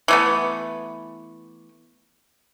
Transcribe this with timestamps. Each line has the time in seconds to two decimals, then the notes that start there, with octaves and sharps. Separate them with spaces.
0.08 E3 A3 B3